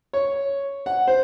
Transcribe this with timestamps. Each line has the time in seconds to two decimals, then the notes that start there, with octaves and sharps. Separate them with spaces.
0.13 C#5
0.86 F#5
1.08 C5